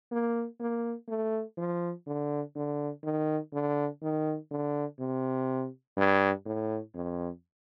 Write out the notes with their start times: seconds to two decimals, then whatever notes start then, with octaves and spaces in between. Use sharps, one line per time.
0.11 A#3
0.60 A#3
1.09 A3
1.57 F3
2.07 D3
2.56 D3
3.04 D#3
3.53 D3
4.02 D#3
4.51 D3
4.99 C3
5.97 G2
6.46 A2
6.95 F2